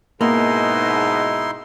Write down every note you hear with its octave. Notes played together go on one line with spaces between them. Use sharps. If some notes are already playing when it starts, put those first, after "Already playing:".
G#2 B2 A#3 D#4 E4 C6